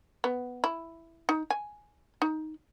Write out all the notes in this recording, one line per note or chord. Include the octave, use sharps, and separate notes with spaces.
B3
E4
D#4
G#5
D#4